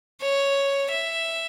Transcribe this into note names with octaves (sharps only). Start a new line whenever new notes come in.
C#5
E5